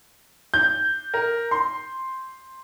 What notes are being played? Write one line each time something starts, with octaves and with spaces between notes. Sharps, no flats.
G6
A#4
C6